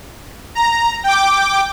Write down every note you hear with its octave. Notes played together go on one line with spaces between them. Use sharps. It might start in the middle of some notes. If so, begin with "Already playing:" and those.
A#5
G5 D6